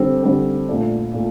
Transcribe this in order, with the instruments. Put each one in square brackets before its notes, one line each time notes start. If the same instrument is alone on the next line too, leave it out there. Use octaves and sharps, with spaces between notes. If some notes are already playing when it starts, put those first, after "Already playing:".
Already playing: [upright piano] D3 G3 C4
D3 G3 C4
A#2 A3 D4
A#2 A3